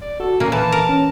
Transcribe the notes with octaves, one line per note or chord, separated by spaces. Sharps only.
D5
F#4 A4
A#2 A#3 C#4
E3 A5
A#4
C#4